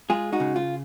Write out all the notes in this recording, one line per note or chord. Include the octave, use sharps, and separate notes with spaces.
G#3 F4 G#4
D#4 F#4
C#3
F4